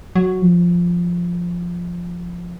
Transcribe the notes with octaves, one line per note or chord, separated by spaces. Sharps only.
F#3
F3